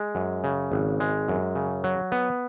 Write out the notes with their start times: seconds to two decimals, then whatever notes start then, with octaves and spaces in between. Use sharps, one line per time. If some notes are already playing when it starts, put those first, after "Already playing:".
Already playing: G#3
0.15 F#2
0.44 C#3
0.72 G#1
1.00 G#3
1.28 F#2
1.55 C#3
1.84 F#3
2.12 B3